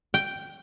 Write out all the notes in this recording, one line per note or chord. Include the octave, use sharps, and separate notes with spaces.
G5